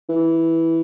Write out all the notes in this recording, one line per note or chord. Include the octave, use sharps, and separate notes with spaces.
E3